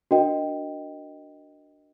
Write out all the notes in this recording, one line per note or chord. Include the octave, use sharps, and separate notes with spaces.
D4 F#4 A#4 D#5 G5